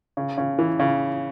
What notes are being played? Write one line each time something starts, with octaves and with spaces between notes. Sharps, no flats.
C#3
C#3
E3
C#3